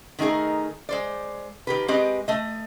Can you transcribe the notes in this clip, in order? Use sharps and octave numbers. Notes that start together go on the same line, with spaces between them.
D#3 A3 D#4 G#4 A#4
G#3 C5 D5
D#3 G4 B4
G#3 C4 G4 B4 D#5
A3 D#5